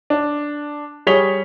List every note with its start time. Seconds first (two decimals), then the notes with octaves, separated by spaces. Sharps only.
0.10 D4
1.07 G3 G#4 C#5 B6 F7 G7